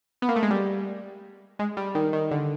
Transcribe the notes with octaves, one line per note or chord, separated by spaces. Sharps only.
B3
A#3
A3
G#3
G3
G#3
G3
D#3
D#3
D3